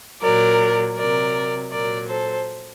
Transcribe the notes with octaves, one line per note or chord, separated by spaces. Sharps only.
A#2 F#3 A#4 D5
C3 F#3 A#4 D5
A#2 F#3 A#4 D5
A4 C5